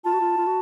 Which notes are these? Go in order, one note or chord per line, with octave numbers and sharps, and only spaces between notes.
F4 A5
F#4
F4
F4
F#4